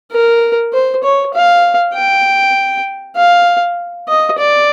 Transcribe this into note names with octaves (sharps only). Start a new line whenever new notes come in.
A#4
C5
C#5
F5
G5
F5
D#5
D5